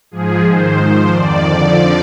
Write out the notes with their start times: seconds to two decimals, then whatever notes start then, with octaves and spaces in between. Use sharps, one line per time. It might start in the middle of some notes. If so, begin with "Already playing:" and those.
0.11 G#2 F3 G#4
0.45 G#2 D#3 C5
0.78 G#2 F3
1.12 F2 D#3 D5
1.46 F2 D3 F3